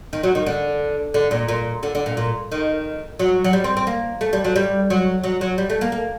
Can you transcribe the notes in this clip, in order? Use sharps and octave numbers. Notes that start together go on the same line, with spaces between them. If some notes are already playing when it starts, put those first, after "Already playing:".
D#3
F#3
D#3
D3
D3
A#2
A#2
D3
D3
A#2
A#2
D#3
F#3
F#3
G3
C4
C4
A#3
A3
G3
F#3
G3
F#3
F#3
F#3
G3
A3
A#3
A#3